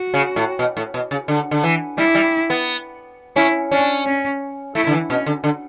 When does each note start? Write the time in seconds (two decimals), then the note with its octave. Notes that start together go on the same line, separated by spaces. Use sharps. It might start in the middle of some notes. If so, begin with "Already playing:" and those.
Already playing: F#4
0.14 C#3
0.36 A2
0.59 B2
0.77 A2
0.94 B2
1.11 C#3
1.28 D3
1.51 D3
1.63 E3
1.97 G3 E4
2.15 G3
2.50 B3
3.36 C#4 E4
3.71 C#4 D4
4.05 C#4
4.75 A3 E4
4.87 D3
4.92 E3
5.10 B2 C#4
5.26 D3
5.44 D3